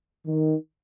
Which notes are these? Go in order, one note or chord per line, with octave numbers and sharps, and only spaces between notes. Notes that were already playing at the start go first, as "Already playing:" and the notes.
D#3